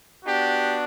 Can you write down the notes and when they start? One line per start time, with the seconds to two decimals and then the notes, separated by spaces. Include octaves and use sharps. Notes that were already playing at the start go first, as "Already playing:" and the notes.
0.24 B3 D4 F#4 G4